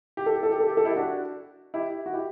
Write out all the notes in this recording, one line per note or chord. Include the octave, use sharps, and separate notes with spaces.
G4
A4
G4
A4
G4
A4
G4
A4
E4 G4
D4 F#4
E4 G4
F#4
E4 G4